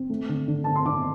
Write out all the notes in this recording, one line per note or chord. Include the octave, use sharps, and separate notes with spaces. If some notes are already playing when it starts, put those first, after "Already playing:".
Already playing: C4
A3
D3
D3
D3 A5
C6
D3 D6